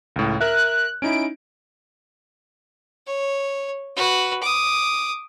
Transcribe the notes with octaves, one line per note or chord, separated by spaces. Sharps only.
C#2 A2
A#4 E5 F#6
C#4 D#4 E4 D7
C#5
F#4 B4
D6 D#6